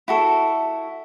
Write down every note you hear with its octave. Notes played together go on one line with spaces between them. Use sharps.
E4 F#4 A4